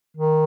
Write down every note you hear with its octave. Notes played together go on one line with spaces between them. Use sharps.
D#3